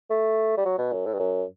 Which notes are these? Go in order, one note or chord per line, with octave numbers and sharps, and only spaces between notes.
A3
G3
F#3
B2
F#2
A2
G2
F#2